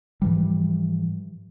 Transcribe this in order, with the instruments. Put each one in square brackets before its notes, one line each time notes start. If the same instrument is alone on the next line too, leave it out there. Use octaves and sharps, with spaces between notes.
[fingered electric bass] G#2 E3 F3 G3